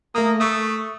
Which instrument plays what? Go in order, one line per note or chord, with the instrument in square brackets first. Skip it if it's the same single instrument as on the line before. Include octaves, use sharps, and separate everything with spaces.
[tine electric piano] A3 D#6 [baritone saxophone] A#3
[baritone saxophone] A3 [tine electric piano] C#6 D#6